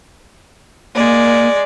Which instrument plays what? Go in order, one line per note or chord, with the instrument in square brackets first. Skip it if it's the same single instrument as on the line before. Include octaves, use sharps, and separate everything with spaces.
[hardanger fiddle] G#3 D5 [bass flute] A#3